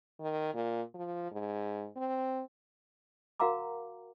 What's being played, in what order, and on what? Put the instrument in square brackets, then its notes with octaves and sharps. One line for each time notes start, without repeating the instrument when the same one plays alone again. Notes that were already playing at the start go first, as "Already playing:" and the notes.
[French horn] D#3
A#2
F3
G#2
C4
[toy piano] F#4 A#4 F5 F#5 A#5 D6